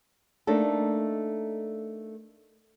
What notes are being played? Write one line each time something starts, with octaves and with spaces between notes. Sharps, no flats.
A3 A#3 D4 D#4 A4